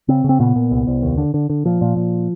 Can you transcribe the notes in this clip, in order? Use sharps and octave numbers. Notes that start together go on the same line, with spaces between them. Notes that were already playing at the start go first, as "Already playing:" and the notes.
C#3 C4
C#3
C4
A#2 B3
A#2
C2
C2
D#2
D3
D3
D3
A#2 F3
A#2
A#2